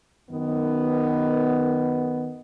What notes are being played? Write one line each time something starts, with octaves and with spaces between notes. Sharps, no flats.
F#2 D#3 B3